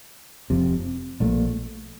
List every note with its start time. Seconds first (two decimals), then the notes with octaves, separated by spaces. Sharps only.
0.50 F1 F2 C3
1.20 A#1 A#2 A3